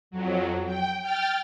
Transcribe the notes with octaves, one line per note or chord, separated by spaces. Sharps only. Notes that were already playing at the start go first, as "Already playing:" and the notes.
F2 F#3
G5
G5 F6 A6